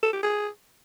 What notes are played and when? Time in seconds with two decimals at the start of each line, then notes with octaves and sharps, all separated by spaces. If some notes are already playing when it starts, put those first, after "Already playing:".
0.03 A4
0.13 G4
0.23 G#4